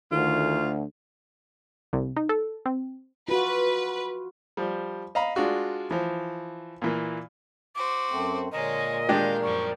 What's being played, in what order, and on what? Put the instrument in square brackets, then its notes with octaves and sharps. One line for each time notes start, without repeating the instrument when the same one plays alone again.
[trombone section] D2 [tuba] D#3 [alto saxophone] F4
[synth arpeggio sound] C2
D#4
A4
C4
[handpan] F4 F#4 [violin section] B4
[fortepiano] F3 G3
D#5 F5 A#5 B5
G#3 D4 F4 F#4
E3 F3
A#2 E3 A#3
[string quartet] F#4 C5 [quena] D6
[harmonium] F#2 A3 C4
[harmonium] A#2 A#4 [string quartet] D3 G#3 C#5 [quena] D#5
[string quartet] D#3 F5 G6 [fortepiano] G#3 D4 G4
[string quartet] F#2 F3 G3 [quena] C#6